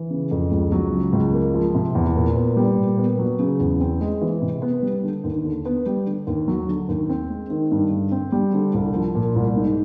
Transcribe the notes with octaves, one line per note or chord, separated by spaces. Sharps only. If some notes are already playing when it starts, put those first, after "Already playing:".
Already playing: E3
C#3
F2
C#2
F#3
C#3
C#2
A#3
F3
C3
E2
A#2
B3
G3
A#2
B3
F#3
C#3
E2
C4
G#3
E3
C3
B3
G3
D3
D#2
D3
B3
G3
D3
D#2
F#3
D3
D#2
C4
G#3
D#3
G2
D3
C4
G3
D3
C2
F3
A#2
C2
G#2